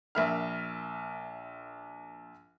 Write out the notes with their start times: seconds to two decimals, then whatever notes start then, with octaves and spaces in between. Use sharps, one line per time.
0.15 A#1 A#4 E5 B5 F6